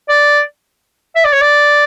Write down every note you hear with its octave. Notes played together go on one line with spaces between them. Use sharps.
D5
E5
D5
C#5
D5